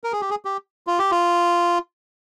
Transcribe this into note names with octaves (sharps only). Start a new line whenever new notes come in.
A#4
G#4
G4
G#4
G4
F4
G4
F4